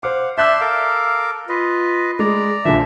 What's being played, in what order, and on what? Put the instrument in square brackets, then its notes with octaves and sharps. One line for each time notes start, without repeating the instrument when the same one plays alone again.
[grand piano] C5 D6 [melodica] F5 F#5
[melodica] D5 A5 C6 [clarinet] E5 [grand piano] E6 F#6 G6
[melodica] A4 A#4 D6 [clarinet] F5
[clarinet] F4 [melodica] B4 D#5
[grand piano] G#3 [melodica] D5 A#5
[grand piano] A#1 D3 F3 [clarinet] E5